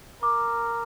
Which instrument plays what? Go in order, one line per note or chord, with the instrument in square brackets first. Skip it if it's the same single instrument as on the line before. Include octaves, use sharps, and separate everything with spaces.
[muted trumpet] A#4 [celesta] D6